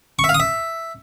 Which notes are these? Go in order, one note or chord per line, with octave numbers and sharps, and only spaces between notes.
C#6
E5
F5
D#6
E5